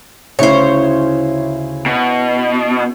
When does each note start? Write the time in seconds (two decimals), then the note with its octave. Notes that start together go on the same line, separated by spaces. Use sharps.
0.39 D2 C#3 C#4 D#4 E4 G#4 C5 C#5
1.86 B2